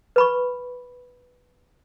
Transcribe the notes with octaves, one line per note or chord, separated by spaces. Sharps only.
B4 B5 C#6